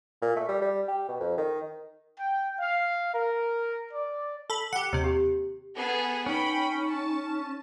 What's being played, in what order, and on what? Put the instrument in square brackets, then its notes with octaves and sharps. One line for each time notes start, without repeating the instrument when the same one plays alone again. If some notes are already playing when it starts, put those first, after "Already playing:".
[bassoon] A#2
A3
G3
G3
G4
B2
F2
D#3
[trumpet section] G5
F5
A#4
D5
[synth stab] A4 B5
[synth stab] G4 F#5 [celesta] C#7
[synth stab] D#2 C3
[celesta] G4
[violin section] B3 G#4 A4
[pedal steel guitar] C#4 [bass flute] D#4 [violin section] G5 B5
[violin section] A5